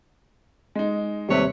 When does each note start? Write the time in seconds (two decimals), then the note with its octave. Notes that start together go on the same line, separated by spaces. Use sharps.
0.75 G#3 D#4
1.29 D#2 C3 G3 A3 B4 C#5